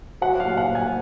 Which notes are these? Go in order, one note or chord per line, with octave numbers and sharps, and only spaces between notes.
F#3 F#5
F5
A#2
F#5
A#2
G#5